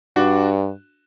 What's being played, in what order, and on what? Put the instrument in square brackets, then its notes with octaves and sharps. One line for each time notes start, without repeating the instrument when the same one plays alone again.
[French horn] G2 [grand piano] D4 F#4